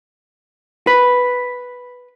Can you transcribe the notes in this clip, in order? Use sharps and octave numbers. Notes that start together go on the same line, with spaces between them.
B4